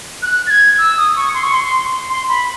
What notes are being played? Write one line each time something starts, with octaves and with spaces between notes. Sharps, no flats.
F#6
A6
G#6
E6
D#6
C#6
C6
C#6
C6
C6
B5